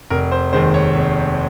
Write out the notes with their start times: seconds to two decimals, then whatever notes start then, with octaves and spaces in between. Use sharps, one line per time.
0.10 F1 A#4
0.32 C5
0.53 D#2 D#3 G#3 C5
0.74 C#5
0.95 F1